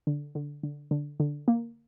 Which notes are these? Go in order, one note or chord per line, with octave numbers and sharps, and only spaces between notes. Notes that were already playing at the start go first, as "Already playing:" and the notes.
D3
D3
D3
D3
D3
A#3